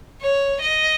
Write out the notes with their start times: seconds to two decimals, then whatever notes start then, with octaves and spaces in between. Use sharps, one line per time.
0.22 C#5
0.61 D#5